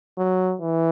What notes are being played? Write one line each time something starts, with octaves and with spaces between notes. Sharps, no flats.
F#3
E3